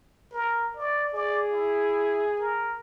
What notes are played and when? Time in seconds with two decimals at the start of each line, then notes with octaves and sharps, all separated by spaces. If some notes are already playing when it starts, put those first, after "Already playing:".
0.32 A#4
0.76 D5
1.14 G#4 D5
1.51 E4
2.40 A#4